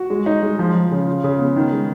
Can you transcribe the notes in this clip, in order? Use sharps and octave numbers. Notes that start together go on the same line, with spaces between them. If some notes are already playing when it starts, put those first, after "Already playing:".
Already playing: F#4
G#3
D#4
G#3
F3
F3
C#3
F4
C#3
B3
D#3
G#3